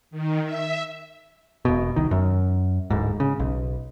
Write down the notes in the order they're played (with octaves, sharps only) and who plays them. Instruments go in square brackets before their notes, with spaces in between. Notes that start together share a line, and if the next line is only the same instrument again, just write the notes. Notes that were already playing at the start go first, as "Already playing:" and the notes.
[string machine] D#3
E5
[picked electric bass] E1 B2
C2 D#3
F#2
D1 G#2
C#3
B1